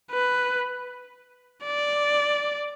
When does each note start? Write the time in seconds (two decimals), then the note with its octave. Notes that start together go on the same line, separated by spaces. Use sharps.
0.12 B4
1.65 D5